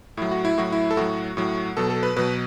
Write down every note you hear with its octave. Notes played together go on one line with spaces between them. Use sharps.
A2 F#3 E4
F#4
E4
A2 F#3 F#4
E4
A4
A2 F#3 F#4
A2 F#3
B2 F#3 A4
A4
B4
B2 F#3 B4